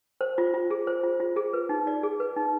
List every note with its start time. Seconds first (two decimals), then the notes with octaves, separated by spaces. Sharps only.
0.21 C5
0.38 F4
0.54 F4
0.70 G#4
0.87 C5
1.04 F4
1.20 F4
1.36 G#4
1.53 B4
1.69 D#4
1.87 D5
2.03 G#4
2.20 B4
2.36 D#4